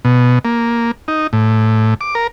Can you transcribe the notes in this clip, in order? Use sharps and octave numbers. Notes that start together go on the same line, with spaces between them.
B2
A#3
D#4
A2
D6
A#4